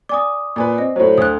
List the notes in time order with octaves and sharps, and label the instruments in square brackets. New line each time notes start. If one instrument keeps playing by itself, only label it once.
[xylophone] D5 G#5 [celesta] D6 D#6
[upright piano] A#2 B4 [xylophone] D5 G#5
[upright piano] C4 [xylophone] D#5
[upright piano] A2 F#3 [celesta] C5
[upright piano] D2 [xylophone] D#6 F#6